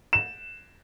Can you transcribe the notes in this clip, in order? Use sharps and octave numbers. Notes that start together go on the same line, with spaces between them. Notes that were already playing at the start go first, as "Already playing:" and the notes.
E7